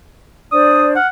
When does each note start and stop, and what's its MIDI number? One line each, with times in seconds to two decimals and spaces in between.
0.52 0.95 62
0.52 0.95 72
0.52 0.95 74
0.52 0.87 87
0.96 1.08 78
0.96 1.06 89